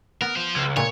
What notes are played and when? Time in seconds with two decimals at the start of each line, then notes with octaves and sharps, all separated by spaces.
0.21 B3 A#4
0.36 F4 C5
0.56 C#2
0.76 A#2 C#5